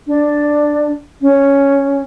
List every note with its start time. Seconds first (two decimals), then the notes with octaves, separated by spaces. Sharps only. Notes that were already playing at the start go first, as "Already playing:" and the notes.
0.07 D4
1.22 C#4